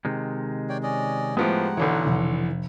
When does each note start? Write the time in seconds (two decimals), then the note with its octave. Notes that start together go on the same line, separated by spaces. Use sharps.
0.05 C3 D#3 G#3
0.69 C#5 D5 G5
0.83 C#4 D5 D#5
1.37 A2 F3 G#3 B3 D#4 G4 F#5 D#6
1.77 B1 D3 E3 C#5
2.06 F1